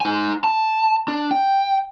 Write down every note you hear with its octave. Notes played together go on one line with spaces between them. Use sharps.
D#4 G#5
A5
D4
G5